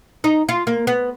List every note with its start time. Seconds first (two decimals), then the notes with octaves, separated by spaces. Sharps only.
0.24 D#4
0.49 F4
0.67 A#3
0.87 B3